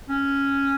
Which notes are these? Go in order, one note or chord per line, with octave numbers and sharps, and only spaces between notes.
C#4